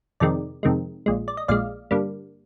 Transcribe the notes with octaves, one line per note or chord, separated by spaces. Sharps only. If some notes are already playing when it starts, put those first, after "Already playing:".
F2 C3 D#3 G#3 D5
F2 C3 D#3 G#3
A#1 A#2 G#3
D5
D#5
A#1 A#2 G#3 D5 F5
G2 D3 G3 A#3